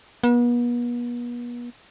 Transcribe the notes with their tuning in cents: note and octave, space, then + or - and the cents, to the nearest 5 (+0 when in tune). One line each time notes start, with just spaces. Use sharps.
B3 -40